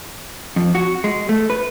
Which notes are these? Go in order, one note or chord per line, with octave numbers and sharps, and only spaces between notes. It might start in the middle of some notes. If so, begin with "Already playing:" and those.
F2
F#4
G#3
A3
B4